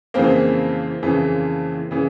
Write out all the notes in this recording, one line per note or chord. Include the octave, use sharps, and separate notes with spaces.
F2 C#3 E3 A#3 C4
F2 C#3 E3
C#3 E3